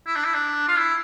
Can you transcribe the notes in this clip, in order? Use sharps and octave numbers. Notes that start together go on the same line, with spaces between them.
E4
D4
E4
D4
F4
E4